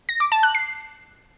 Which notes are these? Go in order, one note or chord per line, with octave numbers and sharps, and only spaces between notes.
A#6
D6
A5
F#6
C7